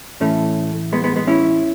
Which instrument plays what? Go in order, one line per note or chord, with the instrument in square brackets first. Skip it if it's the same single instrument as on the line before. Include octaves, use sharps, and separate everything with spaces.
[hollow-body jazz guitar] A2 E3 A3 C#4
G#3 B3
G#3 B3
G#3 B3
C#4 E4